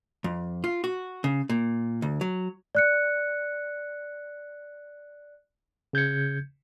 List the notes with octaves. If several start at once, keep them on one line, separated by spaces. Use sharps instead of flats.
F2
F4
F#4
C#3
A#2
D2
F#3
D5 F#6 C#7
C#3 G6 G#6 C#7